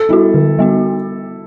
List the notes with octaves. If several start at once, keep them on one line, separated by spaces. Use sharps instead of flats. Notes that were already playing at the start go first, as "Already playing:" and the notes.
Already playing: A4
G3 B3 E4 F#4
D3
G3 B3 F#4